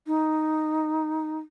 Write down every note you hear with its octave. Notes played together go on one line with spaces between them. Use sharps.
D#4